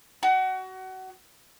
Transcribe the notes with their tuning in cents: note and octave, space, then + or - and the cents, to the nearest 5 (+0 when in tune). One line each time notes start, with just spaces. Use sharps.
F#4 +25